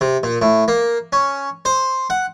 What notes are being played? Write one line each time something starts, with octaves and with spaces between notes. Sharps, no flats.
C3
A#2
A2
A#3
C#4
C5
F#5